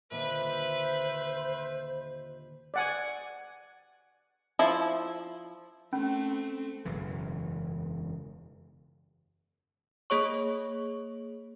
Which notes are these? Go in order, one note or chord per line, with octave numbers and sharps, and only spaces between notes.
D#1 D3 A#3 B4 C5 E5
D5 F#5 G#5
F3 E4
A3 C4 C#4
E1 F#2 C#3 E3
A#3 G#4 C#5 C#6